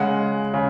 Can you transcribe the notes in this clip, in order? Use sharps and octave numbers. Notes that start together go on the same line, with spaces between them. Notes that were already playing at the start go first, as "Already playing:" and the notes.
Already playing: C#3 G#3 F#5
C#3